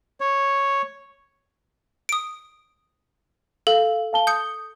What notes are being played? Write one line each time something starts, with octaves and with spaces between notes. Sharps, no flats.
C#5
D#6 D7
A4 F5
F5 A5 G7
D#6 G6 C#7